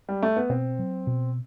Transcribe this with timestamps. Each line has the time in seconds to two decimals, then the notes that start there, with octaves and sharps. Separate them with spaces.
0.09 G3
0.23 A3
0.36 B3
0.49 B2 C4
0.79 F#3
1.07 B2